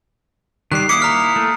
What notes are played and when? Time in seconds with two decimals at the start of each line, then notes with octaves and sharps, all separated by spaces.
0.72 D#3 G3 F#6 C7
0.89 A#3 E4 D6 D#6 C#7
1.02 A#5 F6
1.36 A3